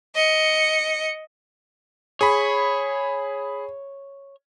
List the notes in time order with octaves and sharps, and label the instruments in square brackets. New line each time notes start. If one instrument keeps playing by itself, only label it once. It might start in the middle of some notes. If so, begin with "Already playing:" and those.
[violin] D#5 C#7
[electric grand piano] G#4 B5 [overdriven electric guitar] C#5